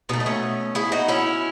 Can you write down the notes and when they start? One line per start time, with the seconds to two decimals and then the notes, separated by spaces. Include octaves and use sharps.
0.09 B2 A3 B3 D#4
0.20 D#4
0.26 A3 C#4
0.75 E4 G#4
0.92 D#4 F#4
1.08 C#4 E4